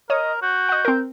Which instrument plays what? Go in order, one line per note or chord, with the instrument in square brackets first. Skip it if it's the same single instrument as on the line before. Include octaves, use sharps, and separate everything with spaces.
[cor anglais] A#4 [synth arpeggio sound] C#5 D#6 [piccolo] D#5
[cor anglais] F#4 [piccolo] G6
[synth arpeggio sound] D#5 F#5
C4 A#4